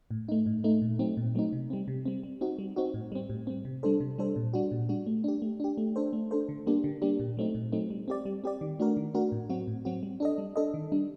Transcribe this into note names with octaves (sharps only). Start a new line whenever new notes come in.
A2
A3 D#4
A2
A3 D#4
A#2
F#3 A3 C4 D#4
A#2
F#3 A3 C4 D#4
C3
G3 C4
C3
G3 C4
G3
C4 D#4 F#4
G3
C4 D#4 F#4
A2
G3 C4
A2
G3 C4
C3
G3 D4 A4 C5
C3
G3 D4 A4 C5
A#2
G3 D4 F#4
A#2
G3 D4 F#4
A3
D4 G4
A3
D4 G4
A3
D4 A4 C5
A3
D4 A4 C5
D3
G3 A#3 D4 G4
D3
G3 A#3 D4 G4
A#2
F#3 A3 C4 D#4
A#2
F#3 A3 C4 D#4
G3
C4 G4 D5
G3
C4 G4 D5
D#3
A3 D4 F#4 A#4
D#3
A3 D4 F#4 A#4
A2
F#3 C4 F#4
A2
F#3 C4 F#4
G3
D4 A4 D#5
G3
D4 A4 D#5
D#3
G3 D4